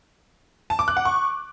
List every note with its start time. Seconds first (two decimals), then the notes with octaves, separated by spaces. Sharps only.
0.70 A5
0.79 D6
0.88 F#6
0.97 F#5
1.05 C#6